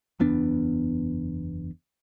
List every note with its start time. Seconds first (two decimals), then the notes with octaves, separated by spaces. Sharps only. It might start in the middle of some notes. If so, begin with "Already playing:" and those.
0.20 F#1 E2 B3 D4